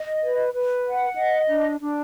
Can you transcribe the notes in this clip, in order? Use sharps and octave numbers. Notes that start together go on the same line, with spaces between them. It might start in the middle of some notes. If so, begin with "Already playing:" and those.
Already playing: D#5
B4
B4
F#5
D#5
D4
D4